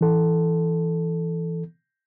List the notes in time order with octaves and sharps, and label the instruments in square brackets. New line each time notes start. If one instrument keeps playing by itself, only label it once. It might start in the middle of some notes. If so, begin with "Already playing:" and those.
[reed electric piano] E3 A4